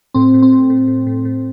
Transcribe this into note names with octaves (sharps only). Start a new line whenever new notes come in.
A2 C4
A2
C4
A2
A2
A2
A2
A2